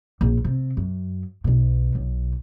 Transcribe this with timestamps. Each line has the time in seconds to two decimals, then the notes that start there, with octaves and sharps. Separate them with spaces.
0.21 A#1
0.45 C3
0.77 F#2
1.44 B1 B2
1.95 B1